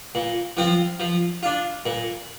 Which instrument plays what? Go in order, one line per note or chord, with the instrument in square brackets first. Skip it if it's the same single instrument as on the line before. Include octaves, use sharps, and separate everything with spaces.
[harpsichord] A#2
F3 C4 F4
F3
D4 F4
A#2